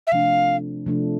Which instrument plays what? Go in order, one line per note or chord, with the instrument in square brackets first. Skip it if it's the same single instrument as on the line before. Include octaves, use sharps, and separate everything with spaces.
[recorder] E5
[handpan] C3 F3 A3 D4 [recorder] F5
[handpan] C3 F3 A3 D4